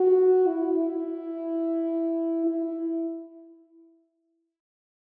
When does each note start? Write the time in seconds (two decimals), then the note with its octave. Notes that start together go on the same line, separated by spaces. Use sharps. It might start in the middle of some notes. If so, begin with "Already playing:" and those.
Already playing: F#4
0.47 E4
0.80 E4
2.47 E4